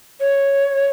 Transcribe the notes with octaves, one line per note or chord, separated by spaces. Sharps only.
C#5